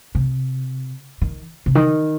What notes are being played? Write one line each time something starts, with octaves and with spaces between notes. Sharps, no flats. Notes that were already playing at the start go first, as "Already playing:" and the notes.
C3
D#3
C3
D#3